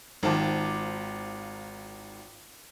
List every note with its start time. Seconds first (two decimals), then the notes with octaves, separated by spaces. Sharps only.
0.23 G#1 D#3 F4 C5 A5 D6